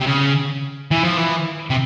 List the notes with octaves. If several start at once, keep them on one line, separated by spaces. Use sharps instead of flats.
C3
C#3
E3
F3
E3
C3